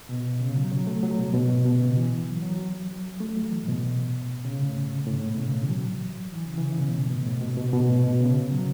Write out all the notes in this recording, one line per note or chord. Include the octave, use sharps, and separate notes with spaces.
B2
C#3
F#3
F#3
A3
F#3
B2
B2
A2
B2
C#3
E3
F#3
F#3
A3
F#3
E3
A2
B2
C#3
A2
A2
A2
B2
C#3
E3
F#3
E3
C#3
E3
C#3
B2
A2
B2
A2
B2
B2
B2
A2
B2
C#3
F#3